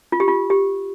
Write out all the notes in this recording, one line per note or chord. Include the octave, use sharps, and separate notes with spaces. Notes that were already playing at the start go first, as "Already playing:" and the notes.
F4
G4
F4
G4